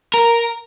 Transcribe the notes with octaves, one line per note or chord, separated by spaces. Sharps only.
A#4